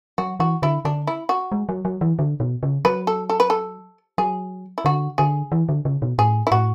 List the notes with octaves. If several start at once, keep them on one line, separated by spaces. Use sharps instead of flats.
F#3 F#4
E3 F#4
D3 E4
D3 D4
E4
F#4
G#3
F#3
F#3
E3
D3
B2
C#3
F#3 B4
A4
A4
B4
A4
F#3 G#4
E4
D3 F#4
D3 G#4
E3
D3
C#3
B2
A2 G#4
E4
A2 F#4